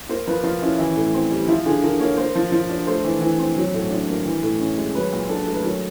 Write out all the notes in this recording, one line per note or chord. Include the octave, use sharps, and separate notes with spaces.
A#3 C5
F3 B4
F3 F4
C#4 E4
E3 E4
A2
C4
G3
F3 E4
D3 G#4
D3 A#4
A#3 C#5
A#3 C5
F3
F3
D4
A3 C5
E3
E3
C4
F#3
A2
D4
A#3
E3
A2
C#4
G#3
F#3 B4
A#2
D4 A4
A3
B4
F#3 A#4